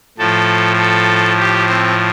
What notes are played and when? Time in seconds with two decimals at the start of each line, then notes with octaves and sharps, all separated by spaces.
0.18 A2 F3 A4
0.79 A4
1.38 G4
1.68 C4